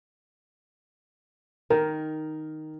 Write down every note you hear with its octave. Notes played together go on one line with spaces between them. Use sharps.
D#3 A#4